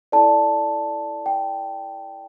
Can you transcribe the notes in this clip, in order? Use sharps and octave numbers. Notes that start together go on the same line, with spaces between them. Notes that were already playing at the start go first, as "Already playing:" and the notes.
E4 A4 D5 A5
G5